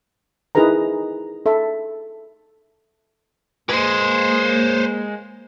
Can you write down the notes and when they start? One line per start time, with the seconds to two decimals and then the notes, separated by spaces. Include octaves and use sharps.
0.55 D#4 E4 G#4 A#4 B4 A#5
1.46 A4 E5
3.69 G#3 A#3 B4 C5